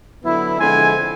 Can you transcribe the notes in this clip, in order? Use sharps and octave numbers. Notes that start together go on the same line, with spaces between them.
D3 F#3 B3 E4
D3 F3 G#3 C4 E4 G#5